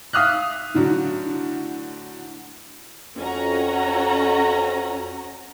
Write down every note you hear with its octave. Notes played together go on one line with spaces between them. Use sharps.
E5 F5 D#6 F6 F#6
A2 D3 F#3
F2 C#4 F#4 A#5